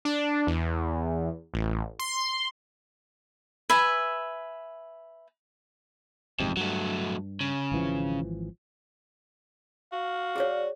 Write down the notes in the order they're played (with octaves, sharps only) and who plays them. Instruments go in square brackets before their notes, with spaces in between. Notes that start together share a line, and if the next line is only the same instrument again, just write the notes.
[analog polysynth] D4
E2
A1
C6
[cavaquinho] B4 E5 G#5
[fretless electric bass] A1 G#2 C3 [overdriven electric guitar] F2
[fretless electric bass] G2 [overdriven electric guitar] F#3 A3
[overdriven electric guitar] C#3
[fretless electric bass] G#1 E3 F3
[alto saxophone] F#4 [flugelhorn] F5
[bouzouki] G3 A3 C#4 [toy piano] G#4 C#5